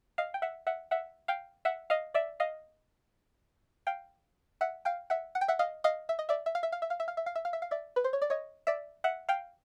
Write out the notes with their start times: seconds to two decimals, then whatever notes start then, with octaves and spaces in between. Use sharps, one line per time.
0.18 D#5 F5
0.34 G5
0.42 E5 F#5
0.67 E5 F#5
0.91 E5 F#5
1.28 F5 G5
1.65 E5 F#5
1.90 D#5 F5
2.14 D5 E5
2.40 D#5 F5
3.87 F5 G5
4.61 E5 F#5
4.85 F5 G5
5.10 E5 F#5
5.35 F#5
5.41 G5
5.48 E5 F#5
5.59 D#5 F5
5.84 D#5 F5
6.09 E5
6.19 D#5
6.29 D5 E5
6.46 E5
6.55 F5
6.63 E5
6.72 F5
6.82 E5
6.90 F5
7.00 E5
7.08 F5
7.17 E5
7.26 F5
7.35 E5
7.45 F5
7.53 E5
7.62 F5
7.71 D5 E5
7.96 B4
8.04 C5
8.13 C#5
8.22 D5
8.30 C#5 D#5
8.67 D5 E5
9.04 E5 F#5
9.29 F5 G5